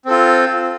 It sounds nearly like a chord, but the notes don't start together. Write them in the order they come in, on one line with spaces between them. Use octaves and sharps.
C4 A4 F4